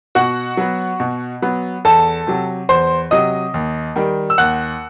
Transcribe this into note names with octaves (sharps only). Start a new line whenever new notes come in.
B2 F#4 F#5
F#3 B3
B2
F#3 B3
E2 A4 A5
C3 F#3
E2 C5 C6
C3 F#3 D#5 D#6
D#2
D#3 G3
E6
D#2 F#5 F#6